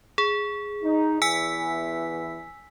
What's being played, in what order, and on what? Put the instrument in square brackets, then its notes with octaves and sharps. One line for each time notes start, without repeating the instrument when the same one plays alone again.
[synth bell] G#4
[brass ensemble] D#4
[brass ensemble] E2 E3 [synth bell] G#5 E6 B6